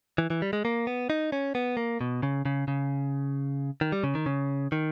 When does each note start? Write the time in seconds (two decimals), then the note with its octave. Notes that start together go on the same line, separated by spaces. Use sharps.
0.18 E3
0.30 E3
0.42 G3
0.53 G#3
0.65 A#3
0.87 B3
1.10 D#4
1.32 C#4
1.55 B3
1.77 A#3
2.01 B2
2.23 C#3
2.45 C#3
2.68 C#3
3.81 D#3
3.92 G3
4.04 C#3
4.15 D#3
4.26 C#3
4.72 D#3